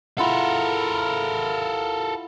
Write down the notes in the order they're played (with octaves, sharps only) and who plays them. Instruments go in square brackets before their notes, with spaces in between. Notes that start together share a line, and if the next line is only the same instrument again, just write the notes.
[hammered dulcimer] E4 F4 F#5 [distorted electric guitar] A4 A#4